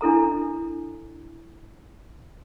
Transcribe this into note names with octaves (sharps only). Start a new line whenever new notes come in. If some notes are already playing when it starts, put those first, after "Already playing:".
D4 E4 A4 A#5